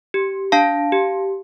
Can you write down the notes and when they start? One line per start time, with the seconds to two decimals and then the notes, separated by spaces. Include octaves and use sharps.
0.14 G4
0.52 D4 F5 A5
0.92 G4